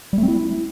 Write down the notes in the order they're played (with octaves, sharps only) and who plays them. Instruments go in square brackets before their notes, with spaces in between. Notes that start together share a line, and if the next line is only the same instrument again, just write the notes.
[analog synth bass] G3
A3
C4
E4